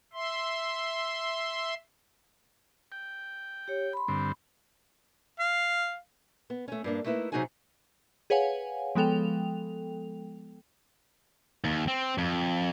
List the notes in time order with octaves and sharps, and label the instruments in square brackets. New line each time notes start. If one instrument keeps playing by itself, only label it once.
[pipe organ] E5 C6
[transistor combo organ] G5
[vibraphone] G4 C#5
B5 C6
[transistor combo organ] G2 D3 C4
[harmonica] F5
[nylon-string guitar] B3
A3 C#4
G2 A#3 D4
A3 A#3 D#4 E4 B4
C3 F#3 D#4 F#4 G#4 G#5
[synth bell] G#4 B4 C#5 F5 F#5 G#5
F3 G#3 B3 A4 G5 F7
[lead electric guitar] D#2
C4
F2